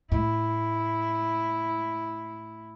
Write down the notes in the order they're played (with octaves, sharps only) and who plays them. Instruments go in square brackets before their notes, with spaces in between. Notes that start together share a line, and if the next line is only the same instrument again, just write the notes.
[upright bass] A2 [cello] E4